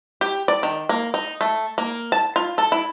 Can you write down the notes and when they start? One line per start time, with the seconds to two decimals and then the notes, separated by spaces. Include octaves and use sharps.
0.21 G4
0.48 D5
0.63 D#3
0.89 A#3
1.14 D#4
1.41 A3
1.78 A#3
2.12 A5
2.36 F4
2.58 A4
2.72 E4